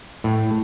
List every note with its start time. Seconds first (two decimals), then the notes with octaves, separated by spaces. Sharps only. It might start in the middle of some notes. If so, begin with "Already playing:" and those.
0.24 A2